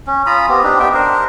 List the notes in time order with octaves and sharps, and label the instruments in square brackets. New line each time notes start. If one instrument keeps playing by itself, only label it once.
[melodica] C#4
F4 A#5 B5 D#6
B3 C4 G4
C4 D4 D#4 G4
B3 G4 E5 G5
D4 A#4 C5